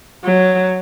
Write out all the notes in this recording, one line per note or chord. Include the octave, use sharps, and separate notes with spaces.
F#3